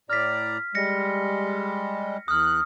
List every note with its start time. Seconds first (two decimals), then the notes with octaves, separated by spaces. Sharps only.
0.10 A2 D5 A#5 F6 B6
0.75 G3 G#3 A#6 C#7
2.28 E2 D#6 F6 F#6